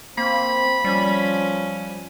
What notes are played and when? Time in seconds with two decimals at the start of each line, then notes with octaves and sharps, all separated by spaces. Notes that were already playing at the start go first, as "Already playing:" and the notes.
0.18 A#3 C4 B5
0.85 F3 G3 C#4